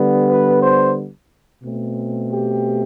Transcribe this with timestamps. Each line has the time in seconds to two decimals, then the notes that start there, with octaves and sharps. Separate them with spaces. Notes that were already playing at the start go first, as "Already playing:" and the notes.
Already playing: D3 G3 B3
0.28 B4
0.61 C5
1.63 B2 A3 C4
2.30 G4